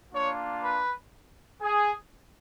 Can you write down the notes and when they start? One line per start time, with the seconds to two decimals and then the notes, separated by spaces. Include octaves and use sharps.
0.12 A#3 D4 F4 C#5
0.63 B4
1.62 G#4